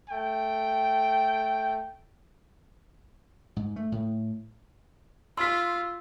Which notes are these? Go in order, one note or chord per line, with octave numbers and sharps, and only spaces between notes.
A3 G5
G#2
A3
A2
F4 C6 E6 B6